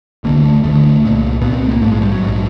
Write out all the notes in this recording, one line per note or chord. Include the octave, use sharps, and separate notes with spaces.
E1 D2 D3 A#3
A3
E1 D2 D3 A3
C2 A#2
C2 A#2 B3
C4
B3
A3
A#3
A#1 G#2 A3
G#3
G3
F#3
A#1 G#2